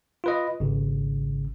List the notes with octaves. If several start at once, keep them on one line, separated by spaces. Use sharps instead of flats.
F4 B4 D#5
G#1 C#3